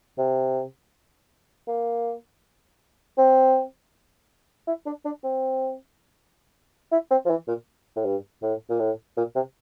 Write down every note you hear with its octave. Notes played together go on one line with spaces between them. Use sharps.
C3
A#3
C4
E4
D4
D4
C4
E4
C4
F3
E3
A#2
A2
G2
A2
A#2
A2
A#2
C3